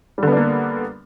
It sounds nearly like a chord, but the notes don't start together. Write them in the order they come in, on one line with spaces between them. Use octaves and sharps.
G3 D3 B3 D4 A#3